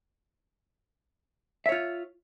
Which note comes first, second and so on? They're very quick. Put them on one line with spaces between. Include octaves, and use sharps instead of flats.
E5 C#5 F4